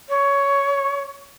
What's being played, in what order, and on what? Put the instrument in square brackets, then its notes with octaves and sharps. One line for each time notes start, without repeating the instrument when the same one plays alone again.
[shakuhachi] C#5